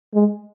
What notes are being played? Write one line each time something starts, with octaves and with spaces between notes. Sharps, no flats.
G#3